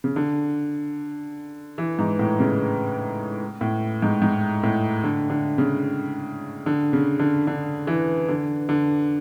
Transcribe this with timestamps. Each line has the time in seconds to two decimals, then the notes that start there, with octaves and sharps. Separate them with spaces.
0.04 C#3
0.16 D3
1.78 E3
1.99 G#2
2.19 A2
2.40 C#3
3.61 A2
4.02 G#2
4.22 G#2
4.63 A2
5.04 D3
5.30 D3
5.58 C#3
6.66 D3
6.93 C#3
7.20 D3
7.47 D3
7.87 E3
8.29 D3
8.69 D3